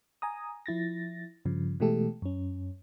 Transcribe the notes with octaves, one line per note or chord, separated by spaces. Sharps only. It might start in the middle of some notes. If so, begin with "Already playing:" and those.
G#5 A#5 D#6
F3 E4 A6 A#6
G2 C#3 F3
B2 E3 G#3 A3 G4 A4
F#2 C#4